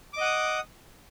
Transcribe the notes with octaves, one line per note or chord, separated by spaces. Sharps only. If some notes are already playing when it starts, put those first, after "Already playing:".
D#5 F#5 D6 D#6